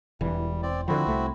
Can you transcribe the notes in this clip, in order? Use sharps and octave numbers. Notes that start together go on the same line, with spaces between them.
E1 E3 G3
C4 D5
D3 F3 C4 E4 F#4
C2 A3